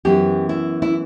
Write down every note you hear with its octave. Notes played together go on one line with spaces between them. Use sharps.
F#2 E3 B3 G4
E4
E4